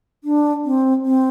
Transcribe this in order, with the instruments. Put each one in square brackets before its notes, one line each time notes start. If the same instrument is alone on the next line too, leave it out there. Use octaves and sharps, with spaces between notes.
[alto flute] D4
C4
C4